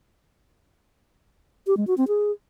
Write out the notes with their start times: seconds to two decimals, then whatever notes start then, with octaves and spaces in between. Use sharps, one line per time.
1.67 G4
1.77 G#3
1.87 F#4
1.98 C4
2.08 G#4